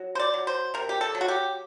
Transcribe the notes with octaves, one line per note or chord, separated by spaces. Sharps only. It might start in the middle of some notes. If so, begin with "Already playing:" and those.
Already playing: F#3
C5
D5
F#3
C5
C3 A#4
G4
A4
F#3
F#4
G4